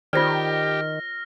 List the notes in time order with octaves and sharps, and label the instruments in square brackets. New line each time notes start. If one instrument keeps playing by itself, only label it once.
[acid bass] D#3 [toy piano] F4 C5 D5 [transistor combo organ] G4 [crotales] F6 A#6